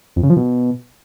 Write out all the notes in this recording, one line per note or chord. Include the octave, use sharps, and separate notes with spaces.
F2
C#3
F3
B2